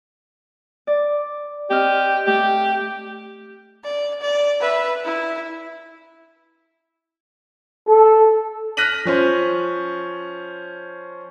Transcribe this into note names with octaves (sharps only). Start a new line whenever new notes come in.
D5
C4 G4 D#5 F6
A3 G4
D5
D5
B4 E5
E4
A4
F6 F#6 A#6 B6 D#7 F#7
F3 C#4 C5